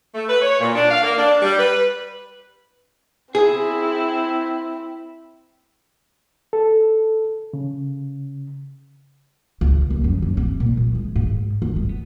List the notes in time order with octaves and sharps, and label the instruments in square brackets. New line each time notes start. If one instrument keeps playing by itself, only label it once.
[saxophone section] A3
B4
C#5
A#2
D4
F5
A#3
D4
G3
B4
[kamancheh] C4 E4 [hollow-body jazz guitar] G#4
[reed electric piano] A4
C#3
[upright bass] C#2
D#2
F#2
F#2
C3
A#2
F3
G#3
G#2
G1
G#3
B3